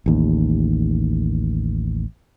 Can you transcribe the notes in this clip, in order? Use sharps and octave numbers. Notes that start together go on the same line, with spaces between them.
A1 D#2